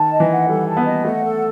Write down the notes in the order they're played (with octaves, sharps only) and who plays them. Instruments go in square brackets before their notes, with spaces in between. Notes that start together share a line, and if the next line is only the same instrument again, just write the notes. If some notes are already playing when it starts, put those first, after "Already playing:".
Already playing: [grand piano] D#3 [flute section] A5
[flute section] D#5
[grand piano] E3
[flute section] F#5
[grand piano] G3 [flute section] A4
[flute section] A5
[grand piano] B3
[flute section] D#5
[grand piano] A3 [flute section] F#5
[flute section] A4